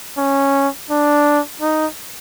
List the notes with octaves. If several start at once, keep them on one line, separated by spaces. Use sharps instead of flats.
C#4
D4
D#4